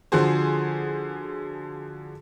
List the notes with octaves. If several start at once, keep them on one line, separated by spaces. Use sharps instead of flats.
D3 F3 F#4 G#4 C5